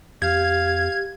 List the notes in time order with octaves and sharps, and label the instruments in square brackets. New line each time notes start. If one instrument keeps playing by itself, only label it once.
[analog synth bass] F2 [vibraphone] G4 [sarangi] F5 [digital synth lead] G#6